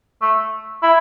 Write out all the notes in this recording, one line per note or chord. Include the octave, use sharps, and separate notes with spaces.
A3
E4